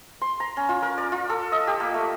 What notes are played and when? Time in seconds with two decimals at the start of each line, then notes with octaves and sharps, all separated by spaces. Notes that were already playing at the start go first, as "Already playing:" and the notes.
0.22 C6
0.40 A#5
0.57 C#4
0.69 F4
0.82 A#4
0.98 D5
1.12 F4
1.30 A4
1.52 D#5
1.67 G4
1.80 A#3
1.94 A3